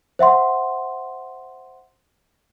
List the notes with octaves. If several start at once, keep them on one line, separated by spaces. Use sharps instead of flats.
C5 E5 F#5 C6